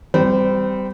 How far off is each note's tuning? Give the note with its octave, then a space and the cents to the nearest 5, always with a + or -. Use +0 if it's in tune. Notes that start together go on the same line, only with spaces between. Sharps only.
G3 +0 C4 -30